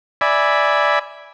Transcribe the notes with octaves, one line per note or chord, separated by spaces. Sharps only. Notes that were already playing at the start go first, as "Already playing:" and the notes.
D5 E5 G#5 B5